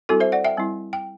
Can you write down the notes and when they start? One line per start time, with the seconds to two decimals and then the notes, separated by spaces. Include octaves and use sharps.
0.09 G3 C4 E4 F#4 A4
0.20 C5 E5
0.32 D5 F#5
0.45 E5 G5
0.57 G3 C4 E4
0.93 G5